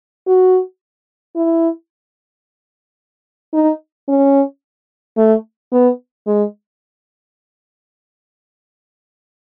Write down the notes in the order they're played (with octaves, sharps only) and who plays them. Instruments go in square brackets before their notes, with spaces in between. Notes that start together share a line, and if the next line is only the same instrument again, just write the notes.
[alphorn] F#4
E4
D#4
C#4
A3
B3
G#3